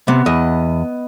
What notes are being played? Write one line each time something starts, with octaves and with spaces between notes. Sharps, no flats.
C3 B3
E2 D#5